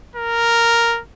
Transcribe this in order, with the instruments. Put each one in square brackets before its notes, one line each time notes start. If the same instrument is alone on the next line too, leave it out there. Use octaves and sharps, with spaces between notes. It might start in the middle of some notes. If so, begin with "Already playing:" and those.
[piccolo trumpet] A#4